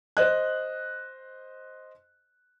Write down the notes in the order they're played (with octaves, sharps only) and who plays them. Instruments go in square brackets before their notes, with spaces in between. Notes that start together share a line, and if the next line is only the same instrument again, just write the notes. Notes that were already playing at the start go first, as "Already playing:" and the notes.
[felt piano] C5 D#5 F#6